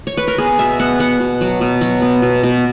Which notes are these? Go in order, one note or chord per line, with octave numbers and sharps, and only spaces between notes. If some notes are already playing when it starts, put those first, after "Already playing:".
C#5
B4
A#4
B3 G#4
B2 E5
B3 F#5
B3 F#5
B2
F#3
B2
F#3
B3
B2
B2